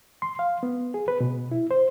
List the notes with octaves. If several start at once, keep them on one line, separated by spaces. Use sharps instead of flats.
C6
F5
B3
G#4
B4
B2
E4
C5